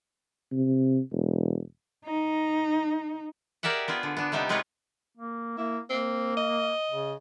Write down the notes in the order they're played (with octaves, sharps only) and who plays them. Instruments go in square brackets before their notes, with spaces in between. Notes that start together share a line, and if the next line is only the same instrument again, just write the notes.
[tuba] C3
E1
[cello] D#4
[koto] G4 G#4 A#4 D5 E5 F#5
B3 F4 G#4
D3
B3 D4
C3 G3 B3 D#4 G4 A4
G#3 D#4 F4 G#4 B4 C#5
[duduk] A#3
[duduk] A#3 [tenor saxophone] E4
[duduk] A#3 [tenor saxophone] C4
[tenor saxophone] D#5
[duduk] C#3